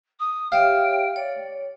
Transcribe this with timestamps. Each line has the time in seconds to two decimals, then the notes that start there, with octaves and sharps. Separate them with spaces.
0.19 D#6
0.52 G4 C#5 E5 F5 G5
1.16 C#5 D5